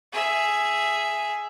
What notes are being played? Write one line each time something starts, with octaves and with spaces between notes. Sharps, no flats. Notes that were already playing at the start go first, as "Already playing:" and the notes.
G#4 E5